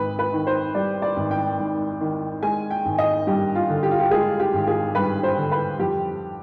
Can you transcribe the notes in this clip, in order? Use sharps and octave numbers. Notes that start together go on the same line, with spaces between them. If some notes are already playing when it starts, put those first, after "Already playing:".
Already playing: G#1 G#2 B4
B4
D#3
C5
G3 D5
D5
G#1
G5
G#2
D#3
G#3 G#5
G5
G#1
D#5
G2 G4
F4
D3
G4
F4
G4
G#3 G#4
G4
G#1
G#4
G2 B4
C5
D3
B4
F2 G4